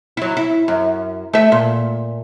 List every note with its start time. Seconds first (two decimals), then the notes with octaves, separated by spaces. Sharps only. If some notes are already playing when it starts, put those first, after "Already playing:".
0.17 F#3 E4
0.37 E4
0.68 F#2
1.33 A3 E5
1.52 A#2